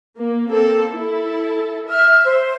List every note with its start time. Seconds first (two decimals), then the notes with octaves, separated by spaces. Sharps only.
0.17 A#3
0.49 A#3 C4 A4
0.92 E4 A4
1.89 E5 F6
2.24 C5